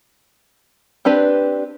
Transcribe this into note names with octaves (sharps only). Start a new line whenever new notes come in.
C4 D4 G4 B4